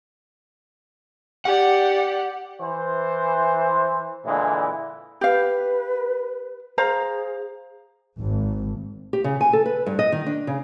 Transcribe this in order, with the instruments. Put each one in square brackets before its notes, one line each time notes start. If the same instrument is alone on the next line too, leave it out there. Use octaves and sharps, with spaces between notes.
[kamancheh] G4 D5 [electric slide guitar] F#5
[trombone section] E3 C5
A#2 D3 E3 G#3 E4
[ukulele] G4 F5 [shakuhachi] B4
[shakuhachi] G#4 [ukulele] C5 F5 A#5
[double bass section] G#1
[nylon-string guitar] G4
C#3
G#5
A4
B4
G2
D#5
D#3
D4
C#3